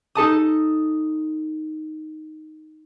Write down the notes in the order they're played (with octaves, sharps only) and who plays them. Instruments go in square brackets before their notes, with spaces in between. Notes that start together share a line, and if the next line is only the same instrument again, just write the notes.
[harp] D#4 A4 A5 D#6